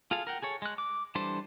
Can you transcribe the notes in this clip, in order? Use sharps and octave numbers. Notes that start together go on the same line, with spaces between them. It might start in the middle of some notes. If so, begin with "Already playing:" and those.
F4 G#4 A4 F5
A#4 F#5 G5
G#4 A4 C#5
G#3 F#6
D6
E3 G3 D4 A4 C5